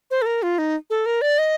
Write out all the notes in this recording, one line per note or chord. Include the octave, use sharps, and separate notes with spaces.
C5
A4
A#4
F4
D#4
A4
A#4
D5
D#5